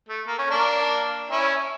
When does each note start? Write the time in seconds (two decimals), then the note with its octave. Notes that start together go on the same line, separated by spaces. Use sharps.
0.08 A3
0.27 A#3
0.38 C#4
0.50 A#3 D4
1.30 C#4 E4